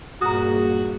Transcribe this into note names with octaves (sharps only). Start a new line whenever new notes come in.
G2 A#2 A#3 F#4 G#4 A#5 D#6